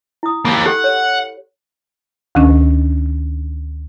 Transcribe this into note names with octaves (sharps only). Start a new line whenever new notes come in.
E4 D#6
A#3 G4 B5
G4 A4 F#5
C#5
D2 D#3 C#4 D4